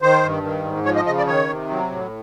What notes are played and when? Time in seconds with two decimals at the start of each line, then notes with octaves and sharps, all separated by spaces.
0.02 D#3 C5
0.23 G2
0.43 D#3
0.65 G#2
0.85 F3 C#5
0.96 D#5
1.06 C#3 D#5
1.18 D5
1.27 D#3 C#5
1.48 C3
1.70 F#3
1.91 A2